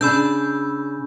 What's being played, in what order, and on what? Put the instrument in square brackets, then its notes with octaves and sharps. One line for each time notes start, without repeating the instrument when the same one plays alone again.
[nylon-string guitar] C#3 D4 [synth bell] B5 E6 G6